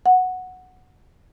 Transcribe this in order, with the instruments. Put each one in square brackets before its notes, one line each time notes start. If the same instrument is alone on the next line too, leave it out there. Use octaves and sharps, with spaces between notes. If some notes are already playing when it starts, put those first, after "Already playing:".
[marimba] F#5